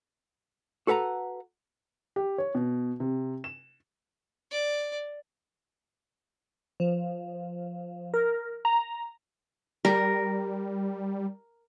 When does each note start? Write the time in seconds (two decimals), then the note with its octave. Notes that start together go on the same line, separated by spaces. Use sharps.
0.87 F#4 A4 B4 F#5 A#5
2.16 G4
2.38 C#5
2.55 B2
3.00 C3
3.44 E7
4.51 D5
6.80 F3
8.14 A#4
8.65 A#5
9.85 G3 A#4